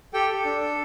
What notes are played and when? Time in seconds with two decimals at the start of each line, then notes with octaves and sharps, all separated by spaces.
0.14 G4 A4 G5
0.30 A4
0.45 D4
0.61 A4